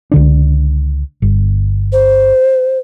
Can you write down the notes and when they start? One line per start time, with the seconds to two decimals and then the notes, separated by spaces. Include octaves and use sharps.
0.11 C#2 D3 D4
1.22 G1
1.92 C5